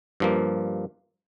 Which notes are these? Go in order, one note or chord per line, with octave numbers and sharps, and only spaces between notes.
G2 F3 A#3